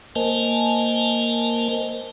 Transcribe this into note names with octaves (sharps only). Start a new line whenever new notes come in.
A#3 A#4 C5 D#5 G#5 A5